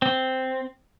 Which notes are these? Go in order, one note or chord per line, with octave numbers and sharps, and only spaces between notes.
C4